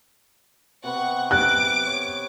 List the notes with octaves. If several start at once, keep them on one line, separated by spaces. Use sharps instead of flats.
C3 B3 F#5 G5 C#6
D6 F#6
C#5